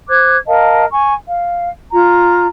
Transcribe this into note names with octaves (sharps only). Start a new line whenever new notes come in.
C5 D6 F#6 G#6
A#4 D#5 F5 A5
G#5 C#6
F5
F4 A#5